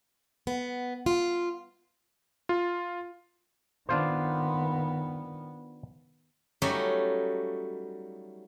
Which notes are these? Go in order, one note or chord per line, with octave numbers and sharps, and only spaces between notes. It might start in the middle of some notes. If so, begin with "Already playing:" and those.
B3
F4
F4
D#3 B3 D4 F4 C5
F#3 G3 A3 C#4 D#4 G4